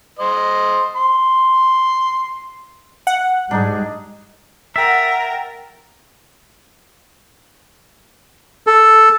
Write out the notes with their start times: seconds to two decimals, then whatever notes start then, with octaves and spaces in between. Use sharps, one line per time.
0.19 C5 D#5
0.96 C6
3.07 F#5
3.51 G#2 G3 D4 D#4 G#4
4.76 A#4 E5 F#5 G5 A6
8.67 A4